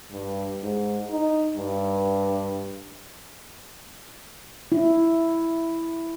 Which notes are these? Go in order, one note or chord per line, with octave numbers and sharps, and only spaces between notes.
G2
G#2
D#4
G2
E4